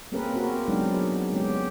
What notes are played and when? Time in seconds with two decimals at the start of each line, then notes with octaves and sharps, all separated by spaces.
0.12 A#3 C4 C#4 G#4 A#4 B4
0.34 B3 C4 F#4 G4 A#4
0.68 F#3 G#3 B3 D4 D#4 F5
0.91 G#4
1.32 G#3 B3 C#4 G4